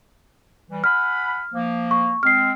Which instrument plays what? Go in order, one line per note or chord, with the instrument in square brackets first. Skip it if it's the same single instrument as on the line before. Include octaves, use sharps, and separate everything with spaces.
[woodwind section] E3 G3
[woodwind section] F#5 G#5 B5 [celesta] F6
[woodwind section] F3 A#3
[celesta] C#6
[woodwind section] G#3 C4 [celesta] F6 C7